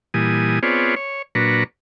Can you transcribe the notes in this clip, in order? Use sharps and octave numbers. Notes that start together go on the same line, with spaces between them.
A#2 E3 G3 G#5 D#6
B3 C4 F4 G#4 C#5 D5
C#5
A#2 F#3 D4 B4 A#5 C#6